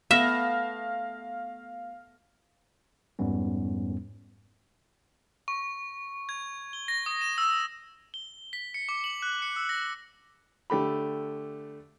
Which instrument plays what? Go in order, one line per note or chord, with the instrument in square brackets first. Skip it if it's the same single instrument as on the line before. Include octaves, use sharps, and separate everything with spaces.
[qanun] A3 B3 [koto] E5 [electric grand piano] F5 F6 A#6
[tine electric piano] F2 G#2 G3 B3 C#4
[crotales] C#6
G#6
G7
A#6
D#6
E7
E6
G7
B6
C#7
D6
F#7
F#6
C#7
E6
A#6
[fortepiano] D3 A3 G4 B5